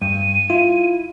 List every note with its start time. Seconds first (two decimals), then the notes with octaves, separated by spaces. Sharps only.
0.02 G2 D#7
0.50 E4 F4